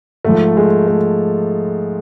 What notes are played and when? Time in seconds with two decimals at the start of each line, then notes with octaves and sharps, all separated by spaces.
0.25 G#2 F3 A3
0.57 G#3
0.87 A3